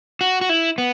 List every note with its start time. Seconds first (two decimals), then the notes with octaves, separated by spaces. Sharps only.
0.21 F#4
0.41 F#4
0.49 E4
0.78 B3